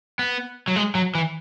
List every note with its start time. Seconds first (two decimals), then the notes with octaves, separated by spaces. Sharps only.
0.19 B3
0.68 F#3
0.76 G#3
0.95 F#3
1.15 E3